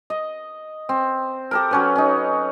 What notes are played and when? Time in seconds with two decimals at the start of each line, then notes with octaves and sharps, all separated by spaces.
0.10 D#5
0.89 C4
1.51 G4 A4 A#4
1.71 F#3 C#4 B4
1.96 C#4 D#4